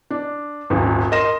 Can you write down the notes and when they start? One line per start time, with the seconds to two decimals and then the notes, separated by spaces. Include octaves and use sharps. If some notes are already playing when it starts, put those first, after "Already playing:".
0.10 D4
0.70 D#1 G#1
1.12 A#4 D#5 C6 A#6 E7